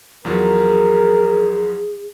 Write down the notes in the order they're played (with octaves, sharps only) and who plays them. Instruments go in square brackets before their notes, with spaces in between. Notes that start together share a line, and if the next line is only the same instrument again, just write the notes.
[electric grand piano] E2 F3 F#3 [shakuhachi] G#4 [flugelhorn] A#4